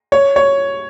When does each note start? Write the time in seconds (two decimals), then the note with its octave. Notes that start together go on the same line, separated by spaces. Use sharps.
0.12 C#5
0.36 C#5